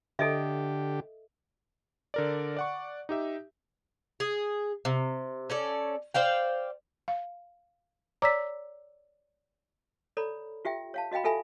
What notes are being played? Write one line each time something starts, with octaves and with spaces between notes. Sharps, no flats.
D3 G4 A4 D#5 E5
D3 A#4 D5
D5 F#5 C#6
D#4 G4 E5
G#4
C3
C#4 A4 D5
C5 D5 F5 G5
F5
C#5 D5 A#5 D6 E6 B6
A4 C#5 D5 A#5 B5
F4 G4 E5 G5
C#5 F5 A5
F#4 D#5 F5 G5 B5
F4 G4 A4 E5 G#5 B5